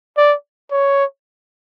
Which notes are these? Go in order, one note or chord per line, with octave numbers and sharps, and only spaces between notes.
D5
C#5